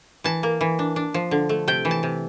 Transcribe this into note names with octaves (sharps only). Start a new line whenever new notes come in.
E3 A5
A#3
E3
D4
D4
F3
D3
A3
C3 G5
E3
A5
C3